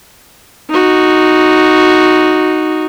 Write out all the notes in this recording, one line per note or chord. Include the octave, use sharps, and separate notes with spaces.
D#4 F#4